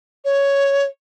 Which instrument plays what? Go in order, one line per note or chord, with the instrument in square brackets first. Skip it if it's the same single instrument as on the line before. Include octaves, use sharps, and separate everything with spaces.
[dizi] C#5